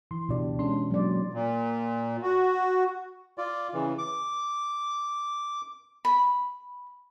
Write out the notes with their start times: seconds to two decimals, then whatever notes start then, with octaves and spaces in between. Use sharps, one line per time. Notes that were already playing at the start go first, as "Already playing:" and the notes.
0.11 E3 C6
0.29 C#2 B2 D4 G4 D5
0.59 G#3 C#4 D4 C6
0.91 F#3 A#3 D5
1.31 A#2
2.23 F#4
3.38 F4 D5
3.74 C#3 E3
3.98 D6
6.05 B5